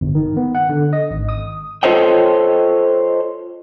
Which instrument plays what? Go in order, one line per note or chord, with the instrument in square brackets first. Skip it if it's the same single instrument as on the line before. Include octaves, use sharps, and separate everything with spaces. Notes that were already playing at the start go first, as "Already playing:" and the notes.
[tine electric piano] G1
D#3
B3
F#5
D3
D#5
G#1
D#6
[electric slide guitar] F4 A4 C5 C#5 D#5 G5